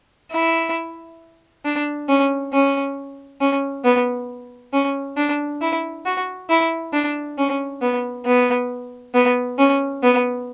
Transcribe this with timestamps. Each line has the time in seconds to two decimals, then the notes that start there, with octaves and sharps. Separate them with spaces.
0.32 E4
1.65 D4
2.09 C#4
2.53 C#4
3.41 C#4
3.85 B3
4.73 C#4
5.17 D4
5.61 E4
6.06 F#4
6.50 E4
6.93 D4
7.38 C#4
7.82 B3
8.25 B3
9.14 B3
9.59 C#4
10.03 B3